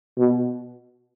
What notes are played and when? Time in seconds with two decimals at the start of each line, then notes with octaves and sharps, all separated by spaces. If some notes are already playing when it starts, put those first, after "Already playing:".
0.18 B2